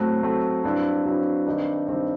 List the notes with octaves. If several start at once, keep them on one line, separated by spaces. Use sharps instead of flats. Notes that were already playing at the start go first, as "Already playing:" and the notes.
Already playing: A2 F#3 A3 C4
A2 F#3 A3 C4
G2 F#3 C4 E4
G2 F#3 C4 E4
G2 D#3 G3 C4 D#4
G2 D#3 G3 C4 D#4